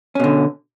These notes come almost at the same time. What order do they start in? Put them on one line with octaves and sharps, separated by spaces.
C#4 B2 D3